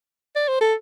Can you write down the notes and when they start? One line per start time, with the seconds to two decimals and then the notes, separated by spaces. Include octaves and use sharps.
0.36 D5
0.49 C5
0.61 A4